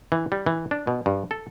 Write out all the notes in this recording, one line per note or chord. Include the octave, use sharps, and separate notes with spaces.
E3
G3
E3
D4
B2
G2
A4